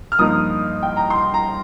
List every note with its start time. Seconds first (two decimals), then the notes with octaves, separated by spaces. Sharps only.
0.12 F6
0.19 G2 F3 A#3 D#4 D#6
0.83 G5
0.97 A#5
1.10 C6
1.34 A#5